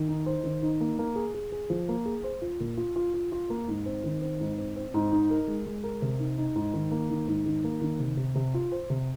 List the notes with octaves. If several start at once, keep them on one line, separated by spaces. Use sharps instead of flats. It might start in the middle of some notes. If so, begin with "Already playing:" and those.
Already playing: D#3
D#4
C5
D#3
D#4
A#3
A#3
G#4
G#4
G#4
F3
A#3
G#4
C5
F4
A#2
F4
F4
F4
F4
A#3
G#2
C4
D#3
C4
G#2
C4
C4
G#2
D#4
A#4
G#3
G#3
A#4
C3
D#4
D#4
G#2
D#3
A#3
D#3
G#2
D#3
A#3
D#3
C3
C3
C3
F4
C5
C3